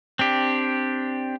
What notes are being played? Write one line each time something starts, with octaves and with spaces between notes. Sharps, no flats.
C4 D4 G4